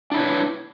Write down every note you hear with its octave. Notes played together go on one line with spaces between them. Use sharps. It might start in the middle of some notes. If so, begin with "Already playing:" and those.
D4 E4 B4 C#5